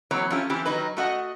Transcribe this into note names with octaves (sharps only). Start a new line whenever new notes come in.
E3 F#3 A#3 C4 C#5
F3 A3 C#4 F4 G4
E3 F3 C4 G4
D#3 F#3 D#4 B4
A3 F#4 D#5 F#5